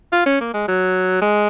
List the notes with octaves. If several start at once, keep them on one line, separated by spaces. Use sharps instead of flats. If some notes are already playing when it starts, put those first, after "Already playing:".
F4
C#4
A#3
G#3
F#3
G#3